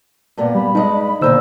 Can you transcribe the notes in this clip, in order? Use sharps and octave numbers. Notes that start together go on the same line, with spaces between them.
G2 A#2 B3
G3 B5
G2 G#3 D#4 D#5
E2 A#2 D3 D#3 C5 E6